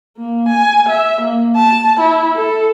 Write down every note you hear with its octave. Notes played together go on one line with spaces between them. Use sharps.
A#3
G#5
E5
A#3
A5
E4
A4